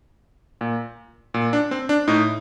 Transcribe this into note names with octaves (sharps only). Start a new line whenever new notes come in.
A#2
A#2
D4
C4
D4
A2 D#4